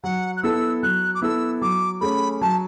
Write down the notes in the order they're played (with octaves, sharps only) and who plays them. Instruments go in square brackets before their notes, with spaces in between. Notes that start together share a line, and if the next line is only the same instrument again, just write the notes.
[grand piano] F#3 [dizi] F#5
[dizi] F#6
[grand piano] B3 E4 A4 [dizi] E6
[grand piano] F#3 [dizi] F#6
[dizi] D6
[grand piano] B3 E4 A4 [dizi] E6
[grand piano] F#3 [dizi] D6
[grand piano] A3 C#4 G#4 C#5 [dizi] B5
[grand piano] F#3 [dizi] A5